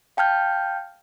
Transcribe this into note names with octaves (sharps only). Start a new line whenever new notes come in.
F5 G5 A5 F6 G6